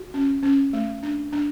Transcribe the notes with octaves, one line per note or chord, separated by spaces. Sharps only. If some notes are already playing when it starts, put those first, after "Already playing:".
Already playing: F#4
C#4
C#4
A3
D4
D4